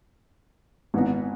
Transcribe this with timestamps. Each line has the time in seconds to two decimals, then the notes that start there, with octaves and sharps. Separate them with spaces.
0.94 G#1 G#2 E3 B3 D#4